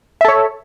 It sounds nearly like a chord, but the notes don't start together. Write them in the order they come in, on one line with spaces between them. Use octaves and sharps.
E5 A4 C#5